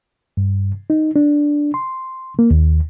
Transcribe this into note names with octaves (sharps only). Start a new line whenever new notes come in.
G2
D#4
D4
C6
A#3
D#2